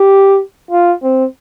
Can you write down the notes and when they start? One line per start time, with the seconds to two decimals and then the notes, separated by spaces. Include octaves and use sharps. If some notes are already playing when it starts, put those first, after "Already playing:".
Already playing: G4
0.71 F4
1.03 C4